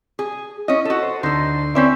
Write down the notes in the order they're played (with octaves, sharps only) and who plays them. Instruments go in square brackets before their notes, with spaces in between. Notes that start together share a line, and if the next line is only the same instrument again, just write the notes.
[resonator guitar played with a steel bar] G#4
[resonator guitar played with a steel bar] C#4 D#5 [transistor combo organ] E4
[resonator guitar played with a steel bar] F#4 A4
[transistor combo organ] C5
[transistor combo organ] D2 C6 [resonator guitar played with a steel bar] D#4 A4
[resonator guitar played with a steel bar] C4 C#4 E4 [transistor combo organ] B4 D5 E5